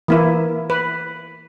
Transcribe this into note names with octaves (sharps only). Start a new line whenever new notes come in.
E3 A#3 E4
B4